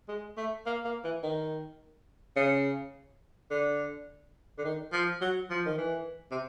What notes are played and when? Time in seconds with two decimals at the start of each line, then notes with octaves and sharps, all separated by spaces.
0.08 G#3
0.37 A3
0.66 A#3
0.85 A#3
1.04 E3
1.23 D#3
2.36 C#3
3.51 D3
4.58 D3
4.65 D#3
4.93 F3
5.21 F#3
5.50 F3
5.66 D#3
5.78 E3
6.31 C3